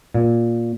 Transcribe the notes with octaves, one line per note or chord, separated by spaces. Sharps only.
A#2